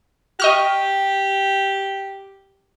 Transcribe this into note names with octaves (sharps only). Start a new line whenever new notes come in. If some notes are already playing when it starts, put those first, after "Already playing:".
G4 D#5 C#6 F6